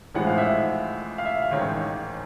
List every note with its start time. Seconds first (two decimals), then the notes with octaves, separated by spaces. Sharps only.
0.15 A1 A2 F3 G#3 F#5
0.27 F5
0.38 E5
1.18 F5
1.25 E5
1.42 F5
1.51 A1 G#2 D#3 C#5